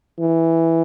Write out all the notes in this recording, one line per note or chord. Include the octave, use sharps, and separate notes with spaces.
E3